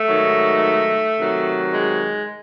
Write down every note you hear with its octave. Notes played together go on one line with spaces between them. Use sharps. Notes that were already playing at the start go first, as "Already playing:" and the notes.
Already playing: A3
G#2 D#3 F#3
C3 D#3 F#3
G#3